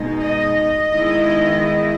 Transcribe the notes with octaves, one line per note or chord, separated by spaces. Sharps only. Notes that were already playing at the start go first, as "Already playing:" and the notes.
Already playing: B2 G#3 D#4
D#5
D#3 G#3 B3 E4